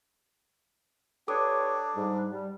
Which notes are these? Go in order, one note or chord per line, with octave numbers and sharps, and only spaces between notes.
D4 G4 A4 B4 C#5 D6 D#6
G#2 G3
G3